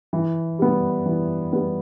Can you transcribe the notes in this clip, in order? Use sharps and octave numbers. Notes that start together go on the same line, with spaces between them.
E3
G3 B3
E3
G3 B3